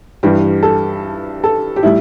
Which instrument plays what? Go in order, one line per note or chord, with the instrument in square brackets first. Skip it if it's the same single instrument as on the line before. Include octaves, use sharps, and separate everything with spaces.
[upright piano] G2 E3 G3 G4
A4
A4
G4
A2 G3 E4